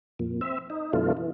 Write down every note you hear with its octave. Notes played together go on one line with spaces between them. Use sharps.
F2 A#2
C4 E5
D#4
F#2 B2 D3 E3 A3 F4
E3